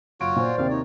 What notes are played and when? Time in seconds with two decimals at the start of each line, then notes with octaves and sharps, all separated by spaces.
0.20 F#1 F4 F#4 C#5 D7
0.36 A#2 C5 D5
0.58 D#2 C3 G4 F5
0.70 D#4 C#5